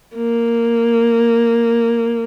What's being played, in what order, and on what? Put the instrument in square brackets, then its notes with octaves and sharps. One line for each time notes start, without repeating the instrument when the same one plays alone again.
[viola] A#3